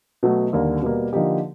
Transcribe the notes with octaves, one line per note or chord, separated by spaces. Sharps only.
B2 F#3 A3
D#2 D3 G3 A#3
B2 G3 A#3
D3 F3 A#3 D#4 G4